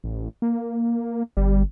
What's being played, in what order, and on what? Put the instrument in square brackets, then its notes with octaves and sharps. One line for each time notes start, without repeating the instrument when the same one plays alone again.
[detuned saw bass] A1
A#3
[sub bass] G1 [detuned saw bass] G3